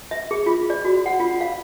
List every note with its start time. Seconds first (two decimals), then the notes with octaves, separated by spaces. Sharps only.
0.11 E5
0.31 G#4
0.46 F4
0.70 D5
0.85 F#4
1.06 F#5
1.20 F4
1.41 F5